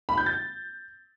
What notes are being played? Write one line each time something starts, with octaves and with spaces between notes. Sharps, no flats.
B5
G6
A6